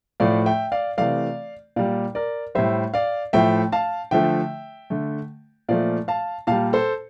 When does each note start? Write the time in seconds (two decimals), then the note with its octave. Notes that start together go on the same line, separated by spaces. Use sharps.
0.20 A2 F3 A3 D5 F5
0.46 E5 G5
0.72 D5 F5
0.98 C3 E3 A3 D5 F5
1.76 A#2 G3 D5 F5
2.15 A#4 D5
2.55 A2 G3 C5 E5
2.94 D5 F5
3.33 A2 F3 A3 E5 G5
3.72 F5 A5
4.11 D3 F3 A3 E5 G5
4.90 D3 A3
5.69 A#2 F3 A3 D5 F5
6.08 F5 A5
6.47 A#2 G3 F5 A5
6.73 A4 C5